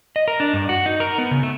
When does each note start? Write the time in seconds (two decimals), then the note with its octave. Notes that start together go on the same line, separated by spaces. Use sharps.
0.16 D#5
0.28 A#4
0.40 D4
0.53 G2
0.69 F#4
0.86 D#4
1.00 A#4
1.18 B3
1.31 C#3
1.43 A3